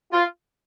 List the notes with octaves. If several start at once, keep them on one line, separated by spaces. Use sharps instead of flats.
F4